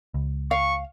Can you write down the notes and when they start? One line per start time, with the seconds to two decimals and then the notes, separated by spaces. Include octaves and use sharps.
0.14 C#2
0.51 F5 C#6